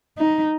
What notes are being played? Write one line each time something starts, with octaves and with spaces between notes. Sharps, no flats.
D#4